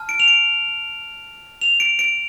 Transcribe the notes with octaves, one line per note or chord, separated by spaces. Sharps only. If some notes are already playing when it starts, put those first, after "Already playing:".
Already playing: A5 F6
D7
F7
D7
F7
D7
D7